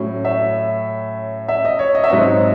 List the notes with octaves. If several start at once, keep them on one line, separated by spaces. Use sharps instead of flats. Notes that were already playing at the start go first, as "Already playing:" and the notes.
Already playing: A2 F#3 C#4
E5
E5
D#5
C#5
D#5
E5
G#2 F#3 C4 D#4 D#5